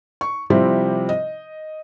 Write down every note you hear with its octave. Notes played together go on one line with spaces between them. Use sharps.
C#6
C3 F3 G3 C4 E4 G4
D#5